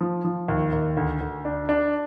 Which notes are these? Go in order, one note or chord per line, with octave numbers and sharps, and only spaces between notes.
F3
F3
D#2
D#2
D2
D2
D4
D4